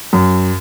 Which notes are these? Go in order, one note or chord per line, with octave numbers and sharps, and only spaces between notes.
F#2